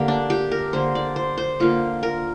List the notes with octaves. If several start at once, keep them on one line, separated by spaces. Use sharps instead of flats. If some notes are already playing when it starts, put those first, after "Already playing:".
Already playing: D3 A#3 G4
D4
G4
A#4
D3 A#3 C5
D5
C5
C5
D3 A#3 F4
A#4